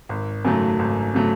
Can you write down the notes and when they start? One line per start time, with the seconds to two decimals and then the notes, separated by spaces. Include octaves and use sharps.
0.09 G#1
0.45 F#2 C#3 F#3 A3
0.79 G#1
1.15 C#3 F#3 A3